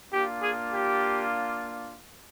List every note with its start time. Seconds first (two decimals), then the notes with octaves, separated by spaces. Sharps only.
0.11 A#3 D4 F4 G4
0.40 G#4
0.70 G4